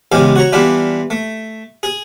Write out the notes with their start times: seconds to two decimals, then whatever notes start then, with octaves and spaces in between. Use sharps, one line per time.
0.12 A1 E2 C#3 G#3 G4 F5
0.36 F#4 C#5 A#5
0.52 E3 G3 B3 D4 F4
1.10 A3
1.83 G#4